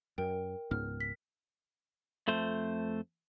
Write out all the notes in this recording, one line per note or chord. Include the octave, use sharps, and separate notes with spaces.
F#2 A#4 G5
C#2 G#2 B3 F6
B6
F2 A3 C5